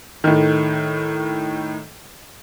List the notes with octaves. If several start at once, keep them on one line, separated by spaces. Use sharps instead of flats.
A2 D#3